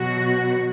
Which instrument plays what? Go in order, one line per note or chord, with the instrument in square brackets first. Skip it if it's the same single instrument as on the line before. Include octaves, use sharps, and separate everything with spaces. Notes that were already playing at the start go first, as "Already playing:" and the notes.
Already playing: [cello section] B2 F#3 F#4